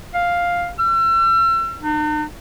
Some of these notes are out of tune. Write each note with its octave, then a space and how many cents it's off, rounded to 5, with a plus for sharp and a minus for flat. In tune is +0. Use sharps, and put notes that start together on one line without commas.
F5 +5
E6 +40
D#4 -45